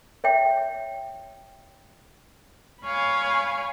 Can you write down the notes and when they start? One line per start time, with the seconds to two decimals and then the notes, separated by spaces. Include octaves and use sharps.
0.24 C#5 E5 G5
2.84 C#5 F5 G#5 B5